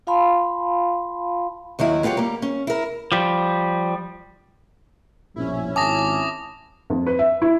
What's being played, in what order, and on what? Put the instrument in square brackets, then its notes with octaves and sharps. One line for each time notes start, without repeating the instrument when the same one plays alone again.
[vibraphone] F4 F5 A5 B5 C6
[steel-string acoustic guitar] D#2 D#3 F#3 E4
B3 F4 G4 B4 C#5
G3 A#3
C#4
E4 A#4
[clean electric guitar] F3 G3
[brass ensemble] A#1 G2 B2 [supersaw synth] C#4 E4
[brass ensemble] G#1 [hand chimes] G#5 A5 [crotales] D6 D#6 A#6
[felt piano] F2
B4
E5
E4